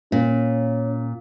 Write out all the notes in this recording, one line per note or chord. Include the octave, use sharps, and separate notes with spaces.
A#2 C#4